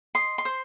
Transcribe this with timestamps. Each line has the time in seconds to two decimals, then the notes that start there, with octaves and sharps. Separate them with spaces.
0.15 D#5 C6
0.38 C6
0.45 C5